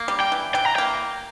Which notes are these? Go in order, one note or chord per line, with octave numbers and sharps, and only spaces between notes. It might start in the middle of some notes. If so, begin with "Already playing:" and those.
Already playing: A#3
G3
G5
E3
E3 G5
A#5
G5
A#3